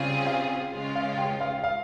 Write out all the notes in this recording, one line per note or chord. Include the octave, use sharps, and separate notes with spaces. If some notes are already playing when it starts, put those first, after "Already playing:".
Already playing: C#3 G3 C4 F4 G#4 F5
F5
C#3 G#3 C#4 F4
F5
G4 G5
F5
F5